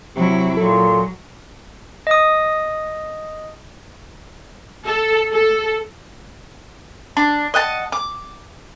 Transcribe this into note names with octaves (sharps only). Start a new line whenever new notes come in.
C3 F#3 E4
A#2 F#3 A4
D#5 D#6
A4
A4
D4
D#5 F#5 G5 A5
D6